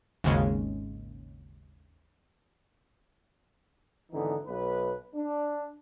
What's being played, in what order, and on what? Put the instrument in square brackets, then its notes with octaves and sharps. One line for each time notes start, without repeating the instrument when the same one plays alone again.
[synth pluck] G#1 D#2 C#3 G#3
[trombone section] G#1 D3 E3 B3 D#4
B1 B4
D4